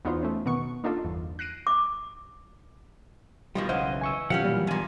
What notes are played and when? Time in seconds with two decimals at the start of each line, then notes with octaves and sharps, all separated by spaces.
0.05 E2 B3 D#4 F4 F#4 C5
0.23 A3 C#4
0.46 B2 D#3 B3 C#6
0.84 A#3 D4 D#4 F4 A4
1.04 G1 E2
1.39 F#6 A#6 C7 D7 D#7
1.67 D6
3.55 B2 D#3 F3 G3
3.69 B1 C#3 E3 C5 D#5 F5 F#5
4.01 G#5 C#6 E6
4.30 B2 D#3 F3 F#3 C#4 G4 F5 F#5
4.44 A#2 E3 G3
4.67 E2 G2 A#2 G#5